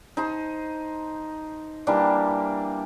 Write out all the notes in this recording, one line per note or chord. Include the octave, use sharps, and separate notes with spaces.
D#4 C5 A5
E3 G3 A#3 D4